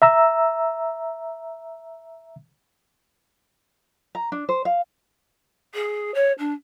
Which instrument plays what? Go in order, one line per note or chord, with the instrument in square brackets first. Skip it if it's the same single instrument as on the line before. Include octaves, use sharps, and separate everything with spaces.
[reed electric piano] E5 A#5 E6
[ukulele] A#5
D4
C5
F5
[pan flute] G#4
C#5
D4